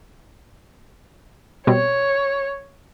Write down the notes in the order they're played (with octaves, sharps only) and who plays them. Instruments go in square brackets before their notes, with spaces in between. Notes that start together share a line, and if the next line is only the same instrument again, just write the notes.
[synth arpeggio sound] B2 G3 C4 [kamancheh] C#5